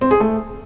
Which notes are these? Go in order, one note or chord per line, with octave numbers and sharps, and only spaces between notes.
C4
G#4
A3